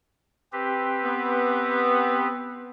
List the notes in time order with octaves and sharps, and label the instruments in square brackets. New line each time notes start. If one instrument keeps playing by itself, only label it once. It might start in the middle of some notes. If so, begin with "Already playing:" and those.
[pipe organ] C4 G4 B4
[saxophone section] B3